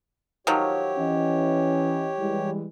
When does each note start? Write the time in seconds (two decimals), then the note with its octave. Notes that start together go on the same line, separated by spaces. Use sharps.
0.47 D#3 F3 F#3 G4 C#5
0.98 E3 C#4 D#5
2.20 E3 G3 G#3